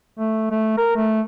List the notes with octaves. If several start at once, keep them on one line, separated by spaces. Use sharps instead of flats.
A3
A3
A#4
A3